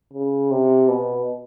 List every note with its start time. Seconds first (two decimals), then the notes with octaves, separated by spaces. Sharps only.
0.13 C#3
0.51 C3
0.88 B2